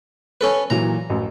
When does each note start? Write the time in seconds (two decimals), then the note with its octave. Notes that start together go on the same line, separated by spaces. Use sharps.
0.41 C#4 A4 B4
0.70 A#2 E3 F#3 A#5
1.10 A1 F#2